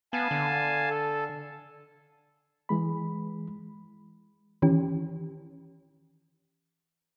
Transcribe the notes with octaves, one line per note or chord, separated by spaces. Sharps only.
B3 F5 G#5 A5
D3
A4
E3 G#3 B5
D#3 E3 C#4 G4